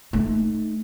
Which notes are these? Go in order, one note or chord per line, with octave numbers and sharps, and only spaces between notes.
A3 D#4